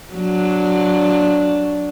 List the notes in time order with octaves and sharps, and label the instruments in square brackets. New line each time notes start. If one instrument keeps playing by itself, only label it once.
[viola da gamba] F#3 D4